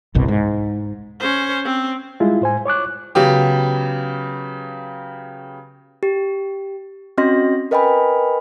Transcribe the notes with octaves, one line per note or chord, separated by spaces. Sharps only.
G1 C2 B2
G#2
C#4 C5
C4
G3 G#3 E4 F4
A2 C5 G#5
C#5 C#6 D6 F#6
C#3 F#3 B3 G4
G4
C4 C#4 F#4 D#5 C6 A#6
A#4 B4 D#5 G5 G#5 B5